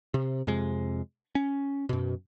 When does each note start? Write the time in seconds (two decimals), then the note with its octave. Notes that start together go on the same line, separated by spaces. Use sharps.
0.14 C3
0.47 F2 C3 G#3
1.35 C#4
1.89 F#2 B2